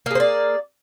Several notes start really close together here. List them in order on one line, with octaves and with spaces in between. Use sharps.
A#3 G#4 C5 D5